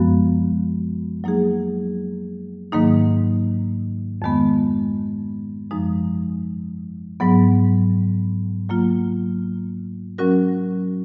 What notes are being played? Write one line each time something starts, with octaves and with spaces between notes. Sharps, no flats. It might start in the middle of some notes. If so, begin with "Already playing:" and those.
Already playing: F#2 F3 G#3 B3 F#4
F#3 A#3 D#4 G#4
G#2 D#3 F#3 A#3 D#4
F2 D#3 G#3 B3
F#2 F3 G#3 D#4
G#2 F#3 B3
F#3 A#3 F4
F#3 C#4 F#4 A#4